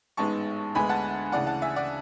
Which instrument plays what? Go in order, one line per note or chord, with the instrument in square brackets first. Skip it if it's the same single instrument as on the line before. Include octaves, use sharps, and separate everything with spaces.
[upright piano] A1 G#2 G#3 B3 A5 C#6
D2 D3 G#3 B3 G#5 B5
F#5 A5
D2 C#3 E3 D5 F#5
F#5 A5
E5 G#5
D5 F#5